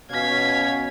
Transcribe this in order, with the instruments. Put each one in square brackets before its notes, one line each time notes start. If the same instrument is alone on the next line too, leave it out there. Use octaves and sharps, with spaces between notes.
[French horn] B2 [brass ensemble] C#4 F5 [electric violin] G#6 B6